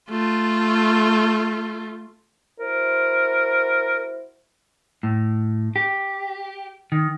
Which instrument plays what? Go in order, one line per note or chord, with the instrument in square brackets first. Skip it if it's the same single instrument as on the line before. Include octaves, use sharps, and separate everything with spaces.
[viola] A3 F4
[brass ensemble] E4 F#4 C5 [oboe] A#4
[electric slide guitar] A2
G4
D#3